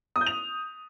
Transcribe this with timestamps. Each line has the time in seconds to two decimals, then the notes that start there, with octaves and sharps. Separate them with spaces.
0.16 D#6
0.21 G6
0.26 F7